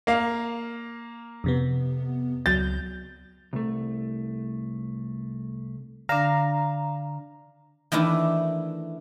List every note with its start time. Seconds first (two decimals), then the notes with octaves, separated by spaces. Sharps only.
0.07 A#3 F5
1.44 F2 C3 B3
2.46 C#2 F#3 G6 A6
3.53 C2 A3
6.09 D3 D4 F5 A#5
7.92 D#3 E3 A3 D4 E4